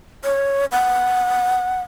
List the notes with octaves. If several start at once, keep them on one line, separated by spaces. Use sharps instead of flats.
C#5
F#5